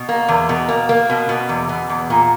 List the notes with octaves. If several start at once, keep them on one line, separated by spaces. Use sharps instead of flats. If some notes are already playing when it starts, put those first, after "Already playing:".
Already playing: B2
A#3
E2
B2
A#3
A#3
B2
B2
E2
B2
E2
A#2